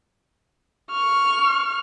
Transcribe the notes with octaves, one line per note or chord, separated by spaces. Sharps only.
C#6 F6